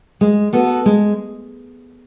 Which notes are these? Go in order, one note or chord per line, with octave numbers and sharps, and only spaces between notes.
G#3
B3 F#4 A4
G#3